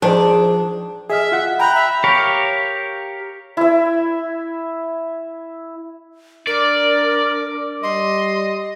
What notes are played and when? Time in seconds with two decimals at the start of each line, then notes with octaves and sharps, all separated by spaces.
0.02 D#3 F3 D4 G#4 C5 A5
1.10 G#4 D#5 E5 F6
1.32 F4 F#5
1.60 G5 A#5 B5 F#6 G6
1.75 E5
2.04 G4 A#4 C#5 F5
3.57 E4 E5
6.47 D4 A#4 D5
7.83 G3 D#5 C6